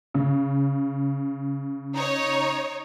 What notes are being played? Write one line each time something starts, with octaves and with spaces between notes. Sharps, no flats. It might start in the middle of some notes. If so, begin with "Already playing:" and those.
C#3
D#4 C#5